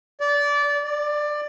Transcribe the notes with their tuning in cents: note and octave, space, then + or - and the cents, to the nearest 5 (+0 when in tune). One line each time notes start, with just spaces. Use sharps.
D5 -20
D5 +15